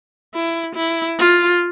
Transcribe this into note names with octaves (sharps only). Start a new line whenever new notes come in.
E4
E4
F4